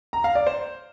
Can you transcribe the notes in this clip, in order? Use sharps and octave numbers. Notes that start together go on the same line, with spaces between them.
A#5
F5
D5
C5